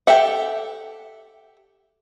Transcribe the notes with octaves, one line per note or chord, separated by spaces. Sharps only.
G4 A4 E5 F#5